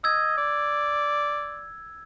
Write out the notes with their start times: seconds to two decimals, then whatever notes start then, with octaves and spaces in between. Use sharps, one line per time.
0.04 D#5 E6 G#6
0.38 D5